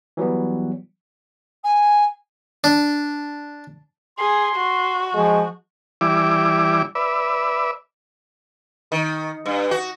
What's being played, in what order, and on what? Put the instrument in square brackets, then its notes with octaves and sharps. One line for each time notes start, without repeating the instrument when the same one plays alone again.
[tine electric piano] E3 F#3 G3 B3
[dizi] G#5
[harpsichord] D4
[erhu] G#4 [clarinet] C6
[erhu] F#4
[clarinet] F3 [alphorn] G#3
[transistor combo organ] E3 G3 E4 D5 D6
B4 D5 E5
[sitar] D#3
G2
F#4